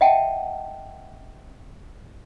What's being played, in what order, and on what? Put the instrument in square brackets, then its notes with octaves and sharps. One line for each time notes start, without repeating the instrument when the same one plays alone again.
[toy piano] D#5 E5 F#5 G5 A5